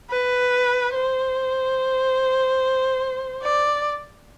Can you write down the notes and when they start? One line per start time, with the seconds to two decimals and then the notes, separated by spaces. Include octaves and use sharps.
0.11 B4
0.94 C5
3.42 D5